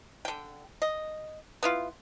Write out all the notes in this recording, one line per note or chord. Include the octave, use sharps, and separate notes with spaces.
D3 G5
D#5
B3 E4 F4